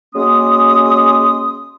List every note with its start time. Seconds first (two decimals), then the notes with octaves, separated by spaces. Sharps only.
0.15 F#3 G#3 A#3 C#4 C6 D#6